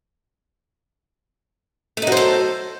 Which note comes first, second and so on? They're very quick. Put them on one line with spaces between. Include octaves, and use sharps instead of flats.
A3 D#4 F#3 C5 A4